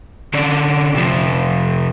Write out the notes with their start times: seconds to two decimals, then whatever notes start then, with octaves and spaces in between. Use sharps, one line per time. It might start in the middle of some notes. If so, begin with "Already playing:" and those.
0.34 D3 C#4 D5
0.95 C3 F3